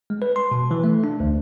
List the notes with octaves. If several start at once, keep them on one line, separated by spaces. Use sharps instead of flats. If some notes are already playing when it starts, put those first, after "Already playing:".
G#3
B4
C6
B2
E3
A3
D4
D2